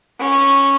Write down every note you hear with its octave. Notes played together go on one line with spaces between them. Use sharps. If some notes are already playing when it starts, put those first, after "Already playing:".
C#4